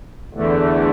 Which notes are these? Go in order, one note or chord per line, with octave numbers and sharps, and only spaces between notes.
E2 D3 A3